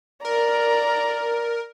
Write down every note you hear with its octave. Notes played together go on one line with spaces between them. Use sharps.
A#4 D5 A#5